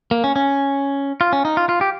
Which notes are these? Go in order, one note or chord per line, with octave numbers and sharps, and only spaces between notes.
A#3
C#4
C#4
F4
C#4
D#4
F4
F4
G4